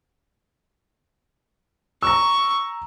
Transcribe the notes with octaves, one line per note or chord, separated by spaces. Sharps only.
A#5 C#6 E6